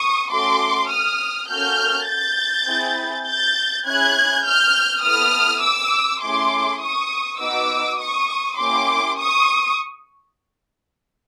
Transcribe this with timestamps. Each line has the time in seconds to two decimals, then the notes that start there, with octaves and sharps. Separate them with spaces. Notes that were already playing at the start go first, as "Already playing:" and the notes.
Already playing: C#6 D#6
0.31 A3 C#4 F#4 A4 C6 D6
0.91 D#6 F6
1.49 A#3 C#4 F#4 A4 F6 G6
2.08 G6 A6
2.68 C4 E4 G#4
3.27 G6 A6
3.86 C#4 E4 G#4 F#6 G#6
4.45 F6 G6
5.04 B3 E4 A4 D#6 F6
5.63 D6 E6
6.22 A3 C#4 E4 G#4 C6 D6
6.82 C#6 D#6
7.40 B3 D#4 F#4 D6 E6
7.99 C#6 D#6
8.59 A#3 C#4 E4 G4 C6 D6
9.18 C#6 D#6